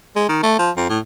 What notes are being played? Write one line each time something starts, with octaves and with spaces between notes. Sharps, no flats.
G#3
D#3
A3
F3
F2
A2